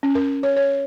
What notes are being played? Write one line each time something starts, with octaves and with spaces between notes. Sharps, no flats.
C#4
A#4
C#5
C#5